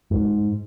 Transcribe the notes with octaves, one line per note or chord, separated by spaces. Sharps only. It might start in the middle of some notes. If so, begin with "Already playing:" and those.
G#2